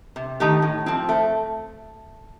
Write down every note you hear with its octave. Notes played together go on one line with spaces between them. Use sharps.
C3
D#3 A3 D#4 G4
A2
F3 C4
A3